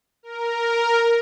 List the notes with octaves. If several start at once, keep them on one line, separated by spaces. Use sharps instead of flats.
A#4